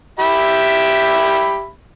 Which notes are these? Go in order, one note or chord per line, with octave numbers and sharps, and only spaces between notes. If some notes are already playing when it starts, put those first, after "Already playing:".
G4 E5 B5